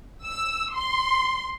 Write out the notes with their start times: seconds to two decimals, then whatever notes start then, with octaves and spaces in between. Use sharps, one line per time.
0.25 E6
0.73 C6